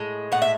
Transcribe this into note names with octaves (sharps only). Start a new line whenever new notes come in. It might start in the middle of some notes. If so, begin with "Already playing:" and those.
Already playing: A2 G#3
A2 F#5
E5